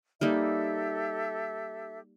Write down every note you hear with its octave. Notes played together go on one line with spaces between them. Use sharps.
G3 A#3 D#4 G4 A4 E5